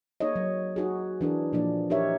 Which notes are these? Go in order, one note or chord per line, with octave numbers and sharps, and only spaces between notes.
A#3 D#4 G#4 C#5 D#5
F#3
D#4 F#4 G#4
E3 D4 G#4 A#4
A#2 F3 A#3 D4 D5
D#4 G4 A#4 C#5 E5